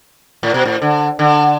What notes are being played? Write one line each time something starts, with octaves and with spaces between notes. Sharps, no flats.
A2
B2
A2
D3
D3